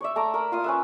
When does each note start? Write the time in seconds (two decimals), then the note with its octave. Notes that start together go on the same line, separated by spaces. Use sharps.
0.01 C#5 D5 E5
0.16 A3 A#5 D6
0.34 A#4 B5
0.52 F4 F5 D#6
0.64 C#4 B4 E5